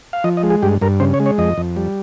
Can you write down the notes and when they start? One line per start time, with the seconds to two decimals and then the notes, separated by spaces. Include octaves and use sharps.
0.13 F5
0.24 F3 D#5
0.37 D#5
0.43 G#3
0.50 G#4
0.62 G2 G4
0.82 G2 A#4
1.00 C#3 C5
1.14 C#5
1.20 G#3
1.26 C#5
1.38 F2 D#5
1.57 F2
1.77 G3